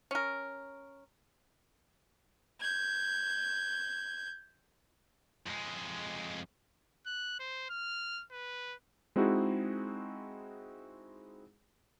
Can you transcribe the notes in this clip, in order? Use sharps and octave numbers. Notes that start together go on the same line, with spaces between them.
C#4 A#4
G6 G#6
F2 G#3
F#6
C5
F6
B4
G#3 C4 D#4 E4 F#4 G#4